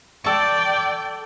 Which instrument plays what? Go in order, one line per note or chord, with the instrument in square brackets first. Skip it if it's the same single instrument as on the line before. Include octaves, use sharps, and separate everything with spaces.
[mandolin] A4 C#6 [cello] D5 G5